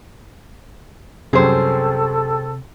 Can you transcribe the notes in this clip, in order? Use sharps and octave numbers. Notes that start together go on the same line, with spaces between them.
C2 F#2 C3 G#4 A4 C5